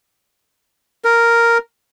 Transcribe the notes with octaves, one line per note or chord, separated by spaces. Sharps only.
A#4